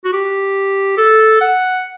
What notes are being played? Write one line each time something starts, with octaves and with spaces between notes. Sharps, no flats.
F#4
G4
A4
F#5